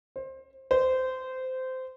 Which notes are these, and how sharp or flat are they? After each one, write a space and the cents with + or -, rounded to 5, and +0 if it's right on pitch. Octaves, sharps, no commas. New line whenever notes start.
C5 +20
C5 -20